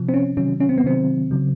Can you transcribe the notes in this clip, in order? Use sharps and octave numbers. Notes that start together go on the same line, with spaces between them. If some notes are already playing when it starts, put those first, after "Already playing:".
Already playing: C3 F3
C4
C#4
C3 D#3 F#3 C#4
C#4
C4
B3
C3 D#3 F#3 C4
C#3 F#3